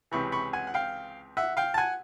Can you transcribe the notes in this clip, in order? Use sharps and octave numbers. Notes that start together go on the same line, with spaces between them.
C#2 C3 E3 B5 C#6
B5 C#6
F#5 G#5
F#5
F5 G5
E5 F#5
F5 G5
A5
F#5 G#5